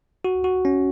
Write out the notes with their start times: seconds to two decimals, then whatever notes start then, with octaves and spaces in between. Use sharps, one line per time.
0.25 F#4
0.44 F#4
0.65 C#4